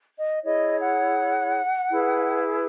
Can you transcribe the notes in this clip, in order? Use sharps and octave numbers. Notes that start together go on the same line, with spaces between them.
D#5
E4 G#4 C#5 D#5
F#5
E4 G#4 B4